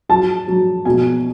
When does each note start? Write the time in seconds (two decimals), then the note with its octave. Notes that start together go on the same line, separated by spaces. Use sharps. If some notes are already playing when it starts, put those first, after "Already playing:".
0.09 F#3 A5
0.48 F#3
0.85 B2 G#5